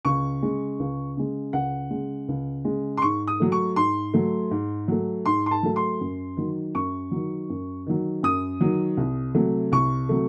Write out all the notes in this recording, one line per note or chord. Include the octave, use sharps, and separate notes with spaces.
C#2 C#6
C#3 G#3
C#2
C#3 G#3
C#2 F#5
C#3 G#3
C#2
C#3 G#3
C6
G#2 C#6
D#6
F#3 A3
C#6
G#2 C6
F#3 A3
G#2
F#3 A3
G#2 C6
C6
A5
F#3 A3
C6
F#2
D#3 F#3
F#2 C#6
D#3 F#3
F#2
D#3 F#3
F#2 D#6
D#3 F#3
C2
C3 F#3 A3
C2 C#6
C3 F#3 A3